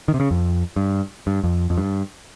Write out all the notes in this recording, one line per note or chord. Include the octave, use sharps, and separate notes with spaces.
D#3
C3
C#3
F2
G2
G2
F2
F2
G2